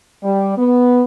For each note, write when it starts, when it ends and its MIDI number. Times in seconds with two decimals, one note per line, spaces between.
0.23 0.53 55
0.57 1.02 59